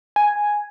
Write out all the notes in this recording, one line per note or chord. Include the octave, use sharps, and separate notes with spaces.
G#5